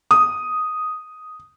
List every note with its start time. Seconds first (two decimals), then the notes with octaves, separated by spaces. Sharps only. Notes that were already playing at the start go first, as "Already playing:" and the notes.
0.11 D#6